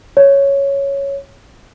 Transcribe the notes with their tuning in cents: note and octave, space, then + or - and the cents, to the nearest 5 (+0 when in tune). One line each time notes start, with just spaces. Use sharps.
C#5 +0